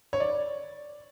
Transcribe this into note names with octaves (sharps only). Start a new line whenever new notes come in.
C#5
D5